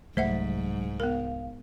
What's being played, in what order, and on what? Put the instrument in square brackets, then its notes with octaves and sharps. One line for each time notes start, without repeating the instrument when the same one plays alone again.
[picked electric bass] C2 G3 A3 [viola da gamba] G#2 [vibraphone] F#3 [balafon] C5 E5 F#5
[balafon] B3 A#4 [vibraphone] F5